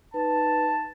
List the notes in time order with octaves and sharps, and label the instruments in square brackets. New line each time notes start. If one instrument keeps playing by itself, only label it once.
[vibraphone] D#4 B4 [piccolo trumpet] A5